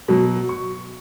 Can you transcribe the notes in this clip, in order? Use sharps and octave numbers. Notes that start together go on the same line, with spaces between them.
B2 F#3
C#6